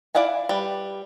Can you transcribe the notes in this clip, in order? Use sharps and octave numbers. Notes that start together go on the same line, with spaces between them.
E4 D5 F5 F#5 G#5
G3 B4